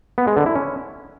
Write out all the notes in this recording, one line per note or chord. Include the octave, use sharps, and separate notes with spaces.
B3
G#3
D3
E4
C#4